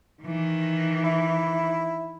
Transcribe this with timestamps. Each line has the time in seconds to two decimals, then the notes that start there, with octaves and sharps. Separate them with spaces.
0.23 D#3 E3
1.04 E4